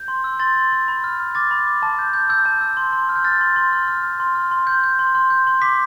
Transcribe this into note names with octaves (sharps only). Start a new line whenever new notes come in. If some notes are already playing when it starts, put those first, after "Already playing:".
Already playing: G6
C6
E6
C6 A6
C6
C6
B5
F6
F6
D6 A6
B5
D6
A5
G6
G6
E6 G6
A5
E6
C6
C6
F6
G6
F6 A6
C6
C6
F6
F6
F6
C6
F6
C6
G6
G6
C6
C6
G6
C6
D6 B6